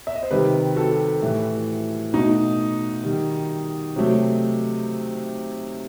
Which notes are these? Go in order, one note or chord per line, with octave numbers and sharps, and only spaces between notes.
E5
D#5
C5
C3 D#3 G3 G4 B4
F#4 A4
A2 E3 G3
B2 A3 D#4 F#4
D#3 G3
C3 F#3 A3